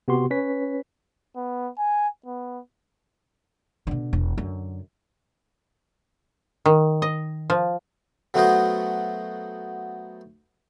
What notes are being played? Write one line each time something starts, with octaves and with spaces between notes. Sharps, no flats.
C3 B3 F#4 G4 C6
C#4 B4 C#5 B6
B3
G#5
B3
B2 D3
E1
F#2 D3
D#3
D#5
F3
F#3 A3 B3 F#4 C5 D#5